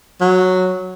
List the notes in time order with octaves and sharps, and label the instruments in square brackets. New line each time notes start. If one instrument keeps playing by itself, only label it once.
[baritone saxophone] F#3